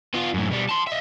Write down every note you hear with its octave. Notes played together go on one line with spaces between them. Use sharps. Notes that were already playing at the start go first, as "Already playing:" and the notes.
B3 F4
F#2 A2
B2 G3
A5 C6
D#5 E5